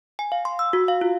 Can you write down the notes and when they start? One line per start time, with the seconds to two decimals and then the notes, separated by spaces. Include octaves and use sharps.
0.19 G#5
0.32 F5
0.45 C6
0.59 E6
0.73 F#4
0.88 F5
1.01 F4